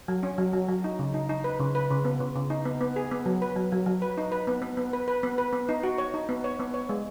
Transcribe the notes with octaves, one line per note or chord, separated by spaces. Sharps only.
F#3
C#4
F#3
F#3
F#3
D#4
C#3
D#4
D#4
B4
C#3
B4
C#3
B3
C#3
C#3
D#4
B3
B3
G#4
B3
F#3
B4
F#3
F#3
F#3
B4
D#4
B4
B3
B3
B3
B4
B4
B3
B4
B3
D#4
F#4
C#5
D#4
B3
C#5
B3
C#5
G#3